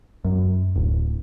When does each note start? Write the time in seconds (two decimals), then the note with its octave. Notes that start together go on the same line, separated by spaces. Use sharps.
0.24 F#2
0.76 D1